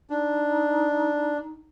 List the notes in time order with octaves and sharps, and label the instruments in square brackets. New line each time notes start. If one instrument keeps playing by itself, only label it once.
[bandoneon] D4 [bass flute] D#4